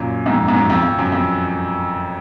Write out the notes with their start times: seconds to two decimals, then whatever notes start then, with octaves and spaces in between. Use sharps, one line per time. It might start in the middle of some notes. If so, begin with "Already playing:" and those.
Already playing: F#2 A#2
0.26 F2 G#2
0.48 G#2
0.55 F#2
0.70 F2
0.83 F2
0.98 F#2
1.12 F2